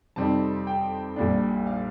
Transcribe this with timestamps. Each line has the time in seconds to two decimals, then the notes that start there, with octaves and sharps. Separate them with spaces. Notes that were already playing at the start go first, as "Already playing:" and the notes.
0.16 F2 C3 G3 C4 D#4 A5
0.67 G5
1.16 A#1 A#2 G3 D4
1.67 F5